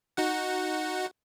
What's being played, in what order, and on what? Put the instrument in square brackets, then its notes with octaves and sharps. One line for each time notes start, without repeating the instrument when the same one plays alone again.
[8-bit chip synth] D#4 F#4 F#5